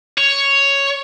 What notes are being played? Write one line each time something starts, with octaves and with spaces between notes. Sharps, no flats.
C#5